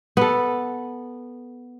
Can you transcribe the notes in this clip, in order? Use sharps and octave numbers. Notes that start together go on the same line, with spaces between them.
B3 A4